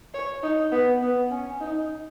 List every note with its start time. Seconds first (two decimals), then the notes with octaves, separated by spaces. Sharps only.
0.14 C#5
0.43 D#4
0.72 B3
1.02 B3
1.31 C#4
1.61 D#4